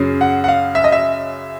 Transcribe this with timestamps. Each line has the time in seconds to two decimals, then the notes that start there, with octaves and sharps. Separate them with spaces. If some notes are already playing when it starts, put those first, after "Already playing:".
Already playing: F#2 C#3
0.21 F#5
0.44 F#5
0.48 F5
0.75 E5
0.84 D#5
0.92 E5